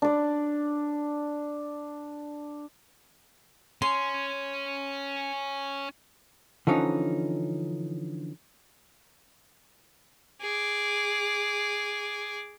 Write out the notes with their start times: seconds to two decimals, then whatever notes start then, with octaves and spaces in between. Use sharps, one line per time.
0.02 D4 D5
3.82 C#4 C6
6.67 D3 E3 F3 C#4 D#4
10.41 G#4 D6